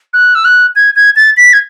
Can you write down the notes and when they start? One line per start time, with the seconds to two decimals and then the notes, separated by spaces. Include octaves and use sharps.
0.13 F#6
0.35 E6
0.45 F#6
0.76 G#6
0.96 G#6
1.16 A6
1.37 B6
1.53 G#6